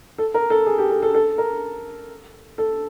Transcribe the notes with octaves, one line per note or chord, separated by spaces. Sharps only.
A4
A#4
A4
G#4
G4
A4
A4
A4
A#4
A4